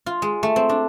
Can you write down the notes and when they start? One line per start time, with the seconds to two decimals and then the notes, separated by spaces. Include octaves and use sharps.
0.06 F4
0.22 G#3
0.43 A3
0.56 C4
0.69 D4